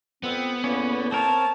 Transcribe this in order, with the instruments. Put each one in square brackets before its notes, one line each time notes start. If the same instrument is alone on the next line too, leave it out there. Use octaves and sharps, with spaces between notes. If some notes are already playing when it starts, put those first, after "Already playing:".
[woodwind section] F2 C4 [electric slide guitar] B3
[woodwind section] E2 A2 A#3 [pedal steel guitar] C#4
[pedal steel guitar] C4 A#4 C#5 [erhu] A5